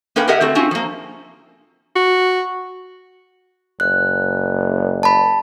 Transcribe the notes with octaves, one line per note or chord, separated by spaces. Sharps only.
A#3 C#4 A#4 B4 G5
G4 G#4 A#4 D#5 E5 F#5
A3 C4 F#4
C4 C#4 F4 F#4
F3 A#3
F#4
F#1 F#6
A5 B5